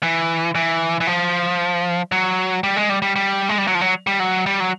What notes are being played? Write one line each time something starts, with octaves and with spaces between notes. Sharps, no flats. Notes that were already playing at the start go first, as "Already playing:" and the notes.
E3
E3
E3
F3
F#3
G3
G#3
G3
G3
G3
G#3
G3
F#3
F3
F#3
G3
F#3
G3
F#3